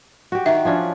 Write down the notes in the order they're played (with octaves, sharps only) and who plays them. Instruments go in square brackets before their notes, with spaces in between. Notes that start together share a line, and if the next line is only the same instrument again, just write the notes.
[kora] F#4 G4
[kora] D#3 [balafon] E5
[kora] F3 C#4 D4